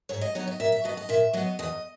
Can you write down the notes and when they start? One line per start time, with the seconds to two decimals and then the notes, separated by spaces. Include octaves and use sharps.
0.09 G#2 C#5
0.21 D#5
0.35 F#3 B3 D#4 C#5
0.47 D#5
0.60 A#2 E5
0.72 E5
0.84 F#3 B3 D#5
0.97 D#5
1.09 A#2 E5
1.33 F#3 B3 D#5
1.59 E2 D#5